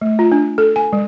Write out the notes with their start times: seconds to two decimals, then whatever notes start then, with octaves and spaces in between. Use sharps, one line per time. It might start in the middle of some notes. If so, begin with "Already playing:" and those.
0.02 A3
0.19 F4
0.32 D4
0.58 A4
0.76 G#5
0.93 G#3